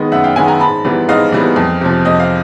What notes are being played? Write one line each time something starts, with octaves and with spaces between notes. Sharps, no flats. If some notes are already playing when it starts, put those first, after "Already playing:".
Already playing: D#3 G#3 B3 D#5
F#2 E5 F#5
F5 G5
D#3 G#3 B3 F#5 G#5
G#5 A#5
G#2 A5 B5
E3 G3 B3
G#2 D#5 F5
E3 G3 B3
F2
C3 F3
F2 D#5
F5